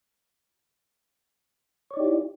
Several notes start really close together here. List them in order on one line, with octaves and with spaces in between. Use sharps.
C#5 D5 D#4 G4 E4